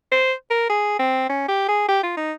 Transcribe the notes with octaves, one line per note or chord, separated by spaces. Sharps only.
C5
A#4
G#4
C4
C#4
G4
G#4
G4
F4
D#4